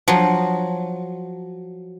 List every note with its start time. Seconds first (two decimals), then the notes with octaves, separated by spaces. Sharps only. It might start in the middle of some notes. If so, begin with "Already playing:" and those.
0.08 F3 F#3